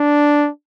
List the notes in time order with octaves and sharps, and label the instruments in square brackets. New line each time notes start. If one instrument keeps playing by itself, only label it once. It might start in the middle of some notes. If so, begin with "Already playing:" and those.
Already playing: [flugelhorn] D4